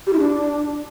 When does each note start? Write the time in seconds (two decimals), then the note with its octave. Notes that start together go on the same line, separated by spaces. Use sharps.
0.07 G4
0.13 E4
0.19 D4